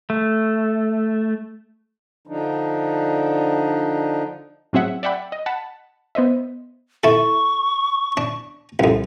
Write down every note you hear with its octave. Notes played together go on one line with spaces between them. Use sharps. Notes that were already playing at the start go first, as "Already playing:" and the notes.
A3
D3 F3 D4 D#4
A2 F#3 C4 G#4 E5 F#5
D5 E5 F#5 G5 B5
D#5
F#5 A5 B5
B3 C5 D#5 E5
E4 A4 C#6
D4
C2 F2